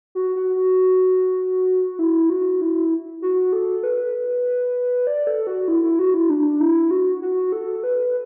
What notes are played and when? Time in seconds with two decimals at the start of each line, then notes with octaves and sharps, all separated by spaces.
0.15 F#4
0.36 F#4
0.56 F#4
1.99 E4
2.30 F#4
2.61 E4
3.22 F#4
3.53 A4
3.83 B4
5.07 D5
5.27 A4
5.47 F#4
5.68 E4
5.83 E4
5.99 F#4
6.14 E4
6.30 D4
6.60 E4
6.91 F#4
7.22 F#4
7.52 A4
7.83 B4